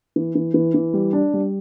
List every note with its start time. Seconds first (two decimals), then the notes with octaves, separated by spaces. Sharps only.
0.16 E3
0.35 E3
0.54 E3
0.74 E3
0.94 G3
1.13 D4
1.34 G3